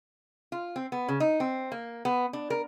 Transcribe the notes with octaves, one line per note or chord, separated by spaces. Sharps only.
F4
C4
B3
C#3
D#4
C4
A#3
B3
D4
A#4